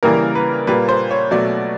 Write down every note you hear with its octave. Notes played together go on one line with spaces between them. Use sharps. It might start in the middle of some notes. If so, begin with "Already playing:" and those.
C#3 E3 G3 A#3 A#4
B4
A#2 G3 A#3 B4
C5
C#5
B2 F#3 A3 D5